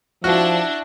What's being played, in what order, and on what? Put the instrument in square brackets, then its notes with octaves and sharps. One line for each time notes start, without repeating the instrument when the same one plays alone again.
[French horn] F3 [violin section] D4 [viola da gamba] E4 [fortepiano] F#4